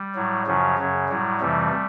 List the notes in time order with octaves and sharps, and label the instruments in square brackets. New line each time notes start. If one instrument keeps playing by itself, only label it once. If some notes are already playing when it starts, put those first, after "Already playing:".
Already playing: [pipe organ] G3
A2 F#3
F#2 C#3 F3 F#3
F#2 C#3 F#3
A2 F#3 G3
F2 C3 E3 G3 A3